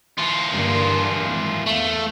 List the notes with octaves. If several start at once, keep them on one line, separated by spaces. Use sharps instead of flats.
E3 F4
G2 D3 A#3
G#1
E2 A3 F5